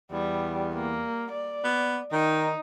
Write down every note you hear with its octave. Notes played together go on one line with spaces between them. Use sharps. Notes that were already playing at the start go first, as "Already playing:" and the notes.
E2 G3
A#3
D5
B3
D#3 D#4